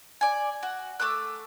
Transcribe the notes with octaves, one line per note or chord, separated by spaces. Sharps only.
D5 G#5
F#4
A3 D6 E6 F#6